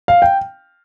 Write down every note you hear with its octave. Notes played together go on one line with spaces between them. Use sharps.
F5
G5